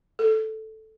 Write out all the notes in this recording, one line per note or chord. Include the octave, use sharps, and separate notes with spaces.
A4